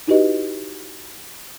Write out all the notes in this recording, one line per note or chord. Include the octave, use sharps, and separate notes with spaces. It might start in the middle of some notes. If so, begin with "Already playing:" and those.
D#4 E4 F#4 G4 B4 D#5